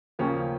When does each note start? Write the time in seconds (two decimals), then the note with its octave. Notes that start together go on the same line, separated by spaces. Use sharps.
0.19 D#2 C#3 F3 A#3 C#4